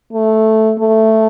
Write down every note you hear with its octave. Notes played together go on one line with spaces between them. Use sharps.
A3
A3